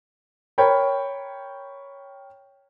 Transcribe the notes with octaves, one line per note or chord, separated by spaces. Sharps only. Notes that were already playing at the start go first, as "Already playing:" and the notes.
A#4 C#5 G5 B5